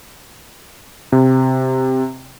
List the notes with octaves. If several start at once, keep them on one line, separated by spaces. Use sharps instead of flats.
C3